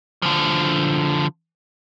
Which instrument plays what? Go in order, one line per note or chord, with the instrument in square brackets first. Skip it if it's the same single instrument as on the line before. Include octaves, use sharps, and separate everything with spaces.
[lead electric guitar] D3 F3